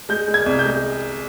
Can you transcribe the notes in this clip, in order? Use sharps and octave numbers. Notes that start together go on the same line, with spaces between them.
G#3 G6
G#3
G#6
C2
G6
G#3